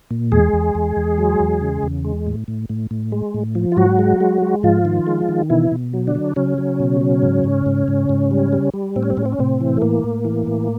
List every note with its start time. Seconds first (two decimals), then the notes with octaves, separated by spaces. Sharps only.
0.11 A#2
0.32 E2 G#3 G#4
0.53 E2
0.75 E2
0.97 E2
1.18 F#3
1.40 E2
1.61 C#3
1.83 E2
2.04 G#3
2.27 A2
2.48 A2
2.69 A2
2.91 A2
3.12 G#3
3.34 A2
3.55 F3
3.72 F4
3.77 G#2 F#3 F#4
3.99 G#3
4.21 G#3
4.42 G#3
4.63 G#2 F3 F4
4.85 D#3
5.07 G#3
5.29 D#3
5.50 B2 E3 E4
5.72 B2
5.93 F#3
6.07 D3 D4
6.15 F#3
6.36 C#3 F#3 C#4
6.58 F#3
6.80 B2
7.01 F#3
7.22 G#2
7.44 G#2
7.66 G#2
7.88 G#2
8.09 G#2
8.31 G3
8.53 G3
8.74 G3
8.96 A2 C4
9.03 C#4
9.10 C4
9.17 A2 C#4
9.26 C4
9.32 C#4
9.39 A2 C3 C4
9.61 E3
9.77 A3
9.82 A2 A#3
10.04 A2
10.25 E3
10.47 A2